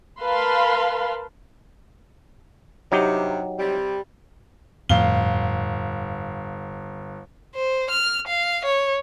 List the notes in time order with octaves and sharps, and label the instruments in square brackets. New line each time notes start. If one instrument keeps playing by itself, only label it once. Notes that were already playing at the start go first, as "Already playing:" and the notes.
[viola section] A#4 B4 F5 A5 B5 C6
[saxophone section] G2 C3 [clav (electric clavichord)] F#3 D#4 G4
[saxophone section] C3 G3
[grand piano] G1 F5 G7 [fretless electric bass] F2 A2 F3
[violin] C5
F6
F5
C#5